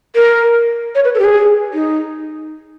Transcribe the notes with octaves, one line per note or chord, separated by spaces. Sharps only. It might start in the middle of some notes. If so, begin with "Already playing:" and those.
A#4
C#5
B4
A4
G4
G#4
D#4